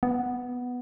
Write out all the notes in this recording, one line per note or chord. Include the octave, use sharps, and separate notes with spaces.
B3